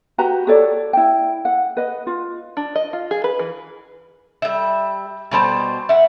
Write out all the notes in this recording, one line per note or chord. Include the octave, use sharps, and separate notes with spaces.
F#4 G4 B4 A#5
G4 A4 C#5 D5
E4 G5
F#5
B4 D#5
F4
D4
D#5
F4
G#4
B4
E3
G3 E5
B2 G3 C5 A5
E5 F#5